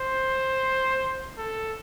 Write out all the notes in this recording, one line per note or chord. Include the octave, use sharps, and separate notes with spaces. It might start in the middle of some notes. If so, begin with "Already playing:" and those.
Already playing: C5
A4